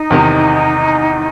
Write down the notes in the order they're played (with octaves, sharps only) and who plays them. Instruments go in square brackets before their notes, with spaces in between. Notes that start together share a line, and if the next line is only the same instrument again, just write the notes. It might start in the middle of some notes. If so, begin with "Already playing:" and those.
Already playing: [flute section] D#4
[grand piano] E2 C3 D#3